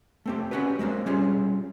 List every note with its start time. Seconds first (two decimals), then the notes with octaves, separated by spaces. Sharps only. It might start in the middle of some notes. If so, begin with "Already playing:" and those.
0.26 A3 C4 G4
0.51 C#4 D#4 F#4 G4 B4
0.79 G#3 A#3 C4 D4
1.06 G3 C#4 F4 G#4